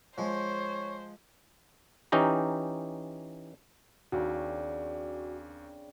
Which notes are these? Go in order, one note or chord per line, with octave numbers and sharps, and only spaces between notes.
F3 G#3 C5 C#5
E3 C#4 D#4 G4 A#5
D#2 C#3 C4 D4 F#4